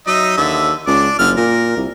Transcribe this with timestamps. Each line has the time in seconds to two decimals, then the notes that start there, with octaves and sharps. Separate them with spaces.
0.07 F#3 D#4 D#5 E5
0.38 D#2 D3 E5
0.87 C#2 D4 D6
1.19 F#1 D3 F6
1.37 A#2 A#4
1.76 C2